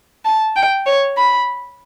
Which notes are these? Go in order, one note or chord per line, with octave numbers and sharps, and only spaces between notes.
A5
G5
C#5
B5